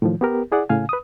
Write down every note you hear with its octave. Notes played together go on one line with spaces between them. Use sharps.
A2 D#3 F3
B3 G4 A#4
E4 G#4 D5 F#5
A2 C#3 F5 G#5
B4 D#6